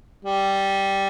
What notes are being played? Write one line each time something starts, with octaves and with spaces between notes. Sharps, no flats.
G3